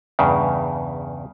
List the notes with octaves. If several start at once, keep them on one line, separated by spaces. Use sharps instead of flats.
E2 G2 C#3